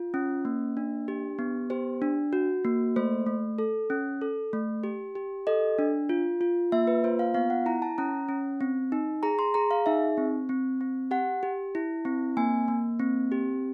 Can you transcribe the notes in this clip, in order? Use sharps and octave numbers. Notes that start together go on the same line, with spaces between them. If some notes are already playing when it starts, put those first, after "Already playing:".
Already playing: F4
C#4
A#3
D4
G4
B3
G4 C5
D4
F#4
A#3
A3 C5
A3
A4
C#4
A4
A3
G4
G4
A4 D#5
D4
F4
F4
A#3 E5
B4
F4 C5
F5
B3 F5
F#5
E4 A#5
A5
C#4 A#5
C#4
C4
D#4
G#4 A#5
C6
G#4 A#5
F5
D#4 E5
C4
C4
C4
G4 F#5
G4
E4
C4
A#3 G#5
A#3
C4
G4